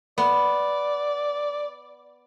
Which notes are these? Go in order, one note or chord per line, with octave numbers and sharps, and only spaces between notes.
B3 D5